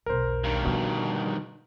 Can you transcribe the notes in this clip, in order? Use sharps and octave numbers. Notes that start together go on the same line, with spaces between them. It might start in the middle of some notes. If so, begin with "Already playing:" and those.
B1 E2 A#4 C5
G2 D#3
B2 D3 F3